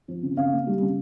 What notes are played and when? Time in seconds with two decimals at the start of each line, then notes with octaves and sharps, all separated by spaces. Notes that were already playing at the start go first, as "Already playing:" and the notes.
0.08 F3
0.22 C#3
0.37 C#3 F5
0.52 A#3
0.67 G3
0.81 C#3